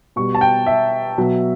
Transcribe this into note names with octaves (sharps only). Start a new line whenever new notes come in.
B2 G3 C#6
A5
G5
E5
B2 F#3